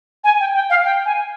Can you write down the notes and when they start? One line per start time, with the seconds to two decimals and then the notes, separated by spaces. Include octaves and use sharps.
0.24 G#5
0.40 G5
0.54 G5
0.70 F5
0.85 G5
1.06 G#5